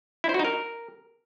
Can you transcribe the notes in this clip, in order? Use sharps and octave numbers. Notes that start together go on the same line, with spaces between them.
E4
C5
F#4
D#4
A#4